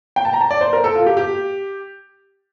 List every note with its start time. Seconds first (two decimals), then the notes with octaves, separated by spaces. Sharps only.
0.16 G5
0.25 A5
0.33 A#5
0.41 A5
0.51 D5
0.61 C5
0.73 A#4
0.84 A4
0.96 F4
1.06 G4
1.17 G4